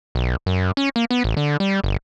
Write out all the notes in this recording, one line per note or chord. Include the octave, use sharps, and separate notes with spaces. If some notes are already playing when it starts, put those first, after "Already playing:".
B1
F#2
C#4
A#3
B3
A1
D3
G3
G1